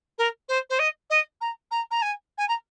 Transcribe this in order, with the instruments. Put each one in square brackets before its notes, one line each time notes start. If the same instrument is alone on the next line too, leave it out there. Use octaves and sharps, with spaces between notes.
[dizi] A#4
C5
C5
D#5
D#5
A#5
A#5
A#5
G#5
G#5
A#5